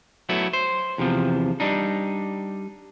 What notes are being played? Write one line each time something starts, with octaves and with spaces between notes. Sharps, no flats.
F#3 A3 B3 E4
C5
E2 C3 F3
G3 D4 D#4